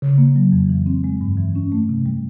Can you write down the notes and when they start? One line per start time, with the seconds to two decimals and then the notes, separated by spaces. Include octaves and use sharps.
0.02 C#3
0.18 A#3
0.36 F#3
0.52 F2
0.69 E3
0.86 C4
1.04 G#3
1.21 G2
1.38 E3
1.55 C#4
1.72 A3
1.89 C3
2.06 G3